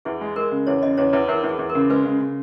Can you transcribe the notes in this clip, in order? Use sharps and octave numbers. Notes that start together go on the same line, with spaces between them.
E2 G#4
G#3
G#3 A#4
C#3
E2 C#5
C#3 D#5
E2 C#5
E2 B4
E2 A#4
E2
G#4
E2
A#4
C#3
G#3 B4
C#3
C#3